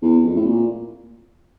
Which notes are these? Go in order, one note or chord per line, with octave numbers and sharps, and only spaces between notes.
E2
F2
A2
A#2